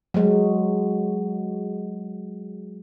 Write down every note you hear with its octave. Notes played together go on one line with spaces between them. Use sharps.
F#3 G#3